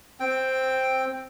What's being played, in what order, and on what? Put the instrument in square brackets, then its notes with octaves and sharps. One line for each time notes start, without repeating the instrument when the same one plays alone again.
[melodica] C4 G5